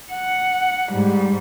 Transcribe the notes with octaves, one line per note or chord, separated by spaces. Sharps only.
F#5
G#2 G3